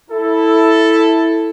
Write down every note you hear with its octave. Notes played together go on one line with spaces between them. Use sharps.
E4 A4